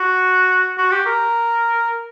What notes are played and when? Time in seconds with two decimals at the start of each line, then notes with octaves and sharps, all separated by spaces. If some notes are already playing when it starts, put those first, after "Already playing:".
Already playing: F#4
0.78 F#4
0.91 G4
1.06 A#4